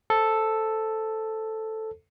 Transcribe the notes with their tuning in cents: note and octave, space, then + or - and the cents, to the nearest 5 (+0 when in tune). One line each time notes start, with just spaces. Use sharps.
A4 +0 C5 +0